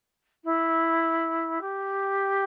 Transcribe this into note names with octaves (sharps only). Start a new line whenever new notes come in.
E4
G4